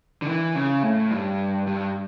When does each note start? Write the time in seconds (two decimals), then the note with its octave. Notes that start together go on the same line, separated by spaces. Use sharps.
0.22 D3
0.26 E3
0.55 C#3
0.83 A2
1.11 G2
1.67 G2